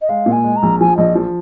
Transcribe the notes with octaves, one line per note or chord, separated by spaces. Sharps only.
D#5
G#3 F5
A#2
G#5
G#3
A#5
A#1
F3 G#5
A#1 D#5
F3